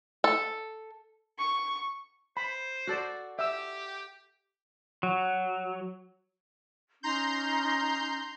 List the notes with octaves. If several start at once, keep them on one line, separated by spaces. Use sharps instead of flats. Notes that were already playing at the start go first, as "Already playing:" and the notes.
A4
C#6
C5 B5
F#4 A4 D5
G4 E5 E6
F#3
C#4 D#4 A#5 C6 G6